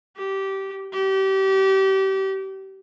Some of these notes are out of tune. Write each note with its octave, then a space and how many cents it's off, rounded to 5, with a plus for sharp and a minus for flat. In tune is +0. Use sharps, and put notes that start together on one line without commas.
G4 -15
G4 -30